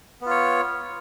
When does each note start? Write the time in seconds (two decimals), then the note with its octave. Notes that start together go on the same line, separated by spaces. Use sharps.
0.21 B3
0.26 F4
0.31 C#5